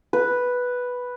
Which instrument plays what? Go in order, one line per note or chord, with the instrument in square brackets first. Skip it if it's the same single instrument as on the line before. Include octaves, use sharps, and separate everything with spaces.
[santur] B4